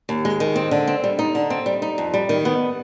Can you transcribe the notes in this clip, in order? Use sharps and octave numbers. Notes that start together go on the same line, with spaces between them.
D#2
G#3
D#3
C4
D3
C4
G3
D#4
D3
C4
G3
D#4
F2
G3
D#3
B3